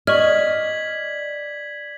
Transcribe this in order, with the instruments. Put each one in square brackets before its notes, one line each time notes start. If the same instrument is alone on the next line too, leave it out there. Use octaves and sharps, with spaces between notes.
[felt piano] D5 [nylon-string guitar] D#5 [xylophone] C#6 F6 [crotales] G#6 B6 F#7